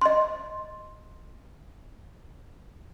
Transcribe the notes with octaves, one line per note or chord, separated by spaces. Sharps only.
D#5 C6